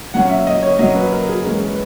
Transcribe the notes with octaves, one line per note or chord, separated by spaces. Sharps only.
A#2 F#3 C#4 F#5
E5
D#5
C#5
A#2 F#3 C#4 D#5
B4
A#4
G#4
E3 G#3 C#4 A#4
B4